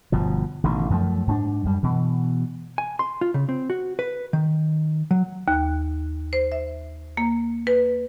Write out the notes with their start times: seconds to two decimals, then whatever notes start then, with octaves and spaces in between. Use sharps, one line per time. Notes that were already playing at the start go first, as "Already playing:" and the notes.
0.12 G1 B2 F3
0.64 A1 B2 D3 D#3
0.90 F#2 F3 G#3 A3
1.27 G#2 C#4 D4
1.65 F#2 G3
1.83 B2 E3
2.78 G#5
2.99 C6
3.21 F4
3.34 C#3
3.49 C4
3.70 F#4
3.99 B4
4.33 D#3
5.11 F#3
5.48 D#2
6.33 C5
6.52 E5
7.17 A#3
7.67 B4